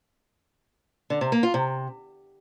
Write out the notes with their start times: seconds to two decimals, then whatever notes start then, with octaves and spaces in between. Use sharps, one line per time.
1.10 D3
1.21 C3
1.32 A#3
1.43 F4
1.54 C3